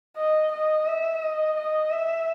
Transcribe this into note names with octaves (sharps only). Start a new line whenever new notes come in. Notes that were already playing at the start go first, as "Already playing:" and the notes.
D#5
D#5
E5
D#5
D#5
E5